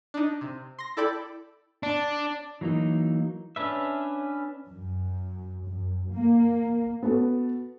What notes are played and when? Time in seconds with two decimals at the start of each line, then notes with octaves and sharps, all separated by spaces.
0.14 D4 D#4
0.41 C3
0.79 C6 A#6
0.97 E4 A4 D5 G5 B5
1.83 D4
2.61 E3 F#3 A#3 D#4
3.56 C#4 D4 B4 E5
4.67 F#2
5.65 F#2
6.12 A#3
7.03 B3 F#4 A4 B4